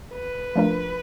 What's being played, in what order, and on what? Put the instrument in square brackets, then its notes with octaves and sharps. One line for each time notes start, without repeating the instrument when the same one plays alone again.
[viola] B4
[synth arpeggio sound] F3 A3 D4 F4 A#4